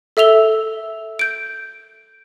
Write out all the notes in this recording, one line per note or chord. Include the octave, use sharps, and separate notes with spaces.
A4 E5 E6 F7 G7
G6 D7